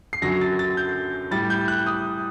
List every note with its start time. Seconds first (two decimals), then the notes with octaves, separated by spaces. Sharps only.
0.13 C7
0.22 F#2 D3 F#3 A#6
0.41 A6
0.59 A6
0.77 G6
1.31 A2 G3 A6
1.50 G6
1.68 F#6
1.87 D#6